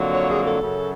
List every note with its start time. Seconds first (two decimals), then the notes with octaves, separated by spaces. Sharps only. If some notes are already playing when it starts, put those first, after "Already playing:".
Already playing: F2 D3 F#3 A#3
0.14 C#5
0.30 G#4
0.46 A4
0.61 F#2 C#3 F#3